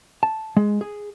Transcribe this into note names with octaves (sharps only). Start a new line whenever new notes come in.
A5
G#3
G#4